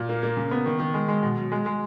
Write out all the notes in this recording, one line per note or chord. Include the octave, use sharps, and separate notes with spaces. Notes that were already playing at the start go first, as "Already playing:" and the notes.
Already playing: A#2
A#3
A#3
C#3
B3
D#3
D#3
G#3
G#3
B2
F#3
G#3
G#3